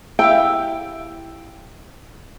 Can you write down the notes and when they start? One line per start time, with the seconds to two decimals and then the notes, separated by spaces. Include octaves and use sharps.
0.19 E4 G4 F5 G5